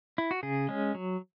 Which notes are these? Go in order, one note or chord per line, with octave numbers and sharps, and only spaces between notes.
E4
F#4
C#3 G#4
G#3 C#4
F#3